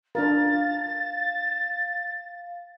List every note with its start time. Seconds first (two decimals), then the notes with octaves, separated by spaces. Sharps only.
0.15 D4 F4 A#4 F5 A6